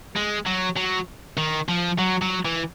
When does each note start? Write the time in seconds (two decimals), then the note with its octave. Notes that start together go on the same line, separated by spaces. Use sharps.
0.16 G#3
0.46 F#3
0.77 F#3
1.37 D#3
1.69 F3
1.99 F#3
2.22 F#3
2.45 E3